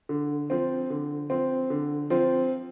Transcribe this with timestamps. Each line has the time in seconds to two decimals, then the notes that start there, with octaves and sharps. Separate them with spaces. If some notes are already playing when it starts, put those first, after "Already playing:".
0.09 D3
0.50 F3 C4
0.90 D3
1.30 F3 C4
1.70 D3
2.10 F3 C4